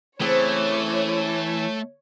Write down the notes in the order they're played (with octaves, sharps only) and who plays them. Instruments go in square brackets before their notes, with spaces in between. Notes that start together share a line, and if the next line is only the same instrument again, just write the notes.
[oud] C#3 C4 [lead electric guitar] E3 [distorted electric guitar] A3 [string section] C#5